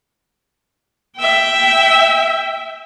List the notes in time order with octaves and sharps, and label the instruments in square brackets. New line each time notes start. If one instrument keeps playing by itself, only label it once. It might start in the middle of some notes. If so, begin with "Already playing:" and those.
[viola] E5 G5